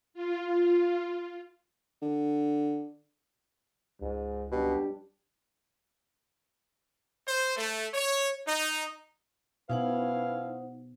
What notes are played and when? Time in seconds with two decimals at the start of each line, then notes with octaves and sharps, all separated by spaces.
0.14 F4
2.02 D3
4.01 C#2 G#2
4.52 F#2 B2 G3 D4 G4
7.27 C5
7.57 A3
7.94 C#5
8.47 D#4
9.70 B2 C#4 D#4 E4 B4 C5 F5 F#5